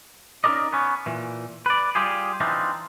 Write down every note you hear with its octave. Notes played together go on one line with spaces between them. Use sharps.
C#4 D#4 G4 A#4 D5 D#5
B3 C#4
A#2 E3
B4 D5
G3 F4 G4 G#4
E3 C4 D4 D#4 F4